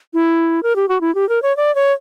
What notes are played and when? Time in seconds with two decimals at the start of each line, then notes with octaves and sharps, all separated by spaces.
0.14 E4
0.63 A#4
0.76 G4
0.89 F#4
1.01 E4
1.15 G4
1.29 A#4
1.42 C#5
1.57 D5
1.75 C#5